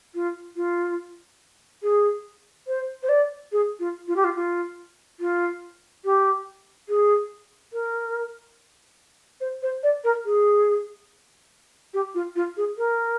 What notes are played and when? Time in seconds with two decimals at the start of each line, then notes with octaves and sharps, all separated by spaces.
0.15 F4
0.56 F4
1.83 G#4
2.67 C5
3.03 C5
3.09 D5
3.52 G#4
3.80 F4
4.08 F4
4.16 G4
4.24 F4
4.36 F4
5.20 F4
6.05 G4
6.89 G#4
7.73 A#4
9.41 C5
9.62 C5
9.83 D5
10.04 A#4
10.25 G#4
11.94 G4
12.15 F4
12.36 F4
12.57 G#4
12.78 A#4